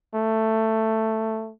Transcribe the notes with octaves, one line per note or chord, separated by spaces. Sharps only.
A3